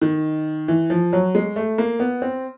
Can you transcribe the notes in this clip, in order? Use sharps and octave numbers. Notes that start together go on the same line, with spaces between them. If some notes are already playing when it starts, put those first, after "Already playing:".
D#3
E3
F3
F#3
G#3
A3
A#3
B3
C4